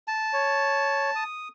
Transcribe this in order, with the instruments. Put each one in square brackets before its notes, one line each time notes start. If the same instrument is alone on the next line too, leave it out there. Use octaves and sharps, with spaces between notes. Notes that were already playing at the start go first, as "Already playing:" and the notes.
[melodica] A5
[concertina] C#5
D#6